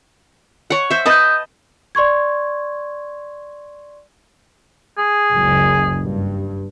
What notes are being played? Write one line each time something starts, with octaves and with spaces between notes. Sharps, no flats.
C#5 F#5
C5 E5
B4 D#5 A5 D#6 G6
D5 C6 C#6 G#6
G#4
F#1 C#2
G2